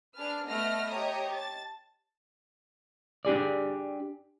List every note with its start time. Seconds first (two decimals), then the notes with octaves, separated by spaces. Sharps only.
0.15 D4 G#4 B4 A5 F6
0.48 A3 B3 A4 D#5 F6 A#6
0.91 G4 C#5 D#5 A#5 D#6
1.33 A5 A6
3.25 D4 G4 G#4 D5